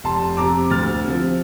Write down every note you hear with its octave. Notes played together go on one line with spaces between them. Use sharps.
F1 A5 C6
F2 C3 A#5 D6
D2 F6 A6
C3 F3